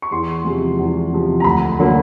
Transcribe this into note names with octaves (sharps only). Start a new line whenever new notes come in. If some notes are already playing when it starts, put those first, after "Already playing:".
C#6
E2 C6
C3 F3 G#3
E2
C3 F3 G#3
A#5
D2 B5
D3 F#3 A#3